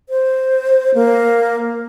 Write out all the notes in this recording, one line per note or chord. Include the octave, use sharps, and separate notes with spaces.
C5
A#3